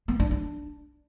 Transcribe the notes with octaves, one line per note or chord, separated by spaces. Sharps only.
B3
D4
D4